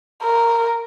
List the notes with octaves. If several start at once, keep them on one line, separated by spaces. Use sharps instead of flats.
A#4